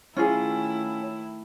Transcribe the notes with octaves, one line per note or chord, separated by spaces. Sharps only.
D#3 A3 C#4 E4 F4 G#4